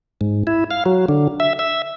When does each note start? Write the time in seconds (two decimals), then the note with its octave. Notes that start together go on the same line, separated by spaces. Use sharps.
0.21 G#2
0.47 E4
0.71 F5
0.86 F#3
1.09 D3
1.40 E5
1.59 E5